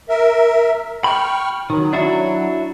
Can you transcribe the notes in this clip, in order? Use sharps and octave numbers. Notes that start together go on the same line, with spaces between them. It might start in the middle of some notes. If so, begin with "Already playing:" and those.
A#4 E5
G5 B5 C#6 F6
D#3 F#3
D4 E4 F#4